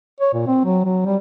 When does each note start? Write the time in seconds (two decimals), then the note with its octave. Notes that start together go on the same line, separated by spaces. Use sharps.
0.20 C#5
0.34 A#2
0.47 C4
0.65 F#3
0.85 F#3
1.06 G3